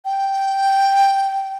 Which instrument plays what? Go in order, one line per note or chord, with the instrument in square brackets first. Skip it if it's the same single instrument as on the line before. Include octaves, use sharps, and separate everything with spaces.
[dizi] G5